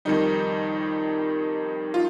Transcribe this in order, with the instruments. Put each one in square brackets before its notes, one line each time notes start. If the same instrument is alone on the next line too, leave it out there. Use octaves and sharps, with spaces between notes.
[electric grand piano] F2 D#3 G3 D#4
F4